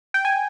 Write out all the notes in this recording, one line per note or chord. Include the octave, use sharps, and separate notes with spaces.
G5
G#5